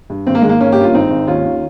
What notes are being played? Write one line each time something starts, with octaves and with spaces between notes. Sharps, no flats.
G2
G#1 C4
A#3
D#3 G#3
A#3
G#1 A#3 C#4
G2 G4
F4
G#1 C4 D#4
G#1
D#2 C#4 F4
D#3